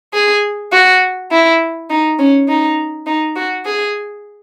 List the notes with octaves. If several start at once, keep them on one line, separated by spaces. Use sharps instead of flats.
G#4
F#4
E4
D#4
C#4
D#4
D#4
F#4
G#4